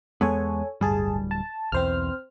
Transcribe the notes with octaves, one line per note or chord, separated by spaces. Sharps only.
E2 G#3 B3 A4 C#5 G#5
D1 G1 G3 G#4 A5
A5
B1 E2 C4 C5 F6